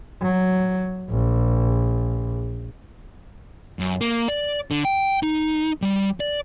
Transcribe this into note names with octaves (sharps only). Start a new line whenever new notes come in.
F#3
A#1
F#2
A#3
D5
D3
G5
D#4
G3
D5